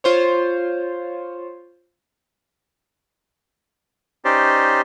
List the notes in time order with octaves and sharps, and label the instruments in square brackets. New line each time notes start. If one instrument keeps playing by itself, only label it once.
[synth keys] F4 C5 C#5
[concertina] C#4 D#4 G4 C5 D5